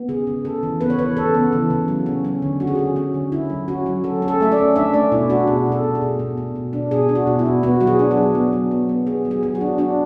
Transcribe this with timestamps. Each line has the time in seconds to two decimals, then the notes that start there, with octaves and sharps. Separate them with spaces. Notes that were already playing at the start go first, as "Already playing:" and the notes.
Already playing: B3
0.08 C#3 G#4
0.27 C#3
0.45 C#3 A4
0.63 E3
0.81 B3 B4
0.90 C#5
0.99 E3 B4
1.16 C#3 A4
1.34 B3
1.52 E3
1.70 C#3
1.88 F#3
2.06 C#4
2.25 C#4
2.42 D3
2.60 C#4 F#4
2.67 G#4
2.75 C#4 F#4
2.96 C#4 F#4
3.14 D3
3.32 C#4 E4
3.50 F#3
3.68 C#4 F#4
3.86 F#3
4.04 F#3 A4
4.22 C#4
4.28 A4
4.40 A3 E5
4.52 D5
4.58 C#4
4.76 D4 E5
4.94 A3 D5
5.12 B2 E4
5.30 D4 F#4
5.47 B2 G#4
5.66 B2
5.72 A4
5.84 B2
5.95 G#4
6.02 B2
6.19 B2
6.37 B2
6.56 B2
6.73 D4
6.91 B2 G#4
7.09 D4
7.15 F#4
7.27 B2
7.39 E4
7.45 B2
7.63 B3 F#4
7.80 F#3 F#4
7.87 G#4
7.99 D4
8.11 G#4
8.17 F#3
8.35 B3
8.53 F#3
8.71 B3
8.89 B3
9.07 B3 G#4
9.25 F#3
9.31 G#4
9.43 F#3 G#4
9.55 F#4
9.61 D4
9.78 D4 F#4